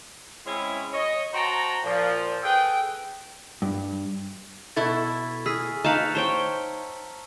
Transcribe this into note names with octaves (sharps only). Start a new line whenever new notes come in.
G#3 C4 C#4 E4
C#5 D#5
F#4 C5 G5 A5 A#5
A#2 F3
G#4 A4 B4 G5
G2
B2 E4 A4 C#6 G#6 A6
G#4 E6 F6 B6
D#4 B4 F5 A5 A#5 C#6 C#7
C5 C#5 G5 A5